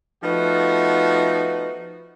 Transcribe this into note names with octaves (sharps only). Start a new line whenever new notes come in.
F3 A3 B3 D#4 F#4